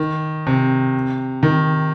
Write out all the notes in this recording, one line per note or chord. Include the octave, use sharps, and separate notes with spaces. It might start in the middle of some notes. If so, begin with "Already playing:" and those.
Already playing: D#3
C3
D#3